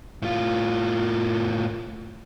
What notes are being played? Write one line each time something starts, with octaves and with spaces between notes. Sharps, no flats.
A2 F4